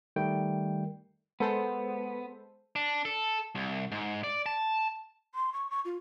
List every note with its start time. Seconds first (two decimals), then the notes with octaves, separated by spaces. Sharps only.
0.16 D#3 G3 A3 G5
1.40 G#3 B3 A4 C5
2.76 D4
3.05 A4
3.55 C2
3.92 G#2
4.24 D5
4.46 A5
5.35 C6
5.53 C#6
5.70 C#6
5.85 F4